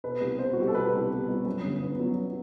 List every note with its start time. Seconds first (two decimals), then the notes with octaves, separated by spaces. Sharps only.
0.04 B2 B4
0.21 C2
0.39 B3 C5
0.53 F#4
0.57 G3 G4
0.67 A4
0.75 B2 B4
0.93 C2
1.10 B3
1.28 G3
1.46 F#2
1.64 G1
1.82 B3
2.00 F#3